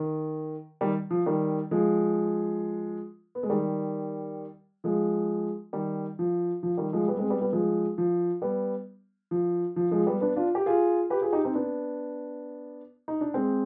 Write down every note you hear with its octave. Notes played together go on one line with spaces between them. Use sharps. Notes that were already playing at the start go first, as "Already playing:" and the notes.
Already playing: D#3
D#3 G3
F3
D#3 G3
F3 G#3
B3
G#3
D#3 G3
F3 G#3
D#3 G3
F3
F3
D#3 G3
F3 G#3
G3 B3
G#3 C4
G3 B3
G3 B3
F3 G#3
F3
G3 B3
F3
F3
F3 G#3
G3 B3
B3 D4
D4 F4
G4
F4 G#4
G4 B4
F4 G#4
D#4 G4
C4 D#4
B3 D4
D#4
D4
G#3 C4